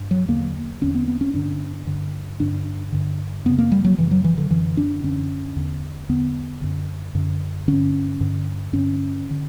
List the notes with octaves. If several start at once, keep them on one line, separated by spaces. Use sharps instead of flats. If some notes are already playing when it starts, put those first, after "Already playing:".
Already playing: G2
F#3
E2 D3 A#3
E2 D3 C#4
B3
B3
C#4
G2 D3 D4
G2 D3
G2 D3 D4
G2 D3
F#2 C#3 B3
A#3
G3
F#3
F#2 C#3 E3
F#3
E3
D3
F#2 D3 E3
D4
F#2 D3 C#4
E2 D3
E2 D3 B3
F#2 D3
F#2 D3
G2 D3 C#4
G2 D3
G2 D3 C#4
D3